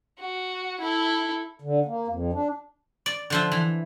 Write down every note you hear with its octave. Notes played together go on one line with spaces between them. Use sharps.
F#4
E4 A4
D3
A#3
F2
D4
D5
D3 F3 E5
E3